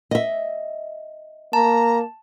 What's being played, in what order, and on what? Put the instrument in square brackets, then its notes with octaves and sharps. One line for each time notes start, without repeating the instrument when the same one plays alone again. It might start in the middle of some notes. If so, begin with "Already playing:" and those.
[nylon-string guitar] D#5 E5
[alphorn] A#3 [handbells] A5 [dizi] A#5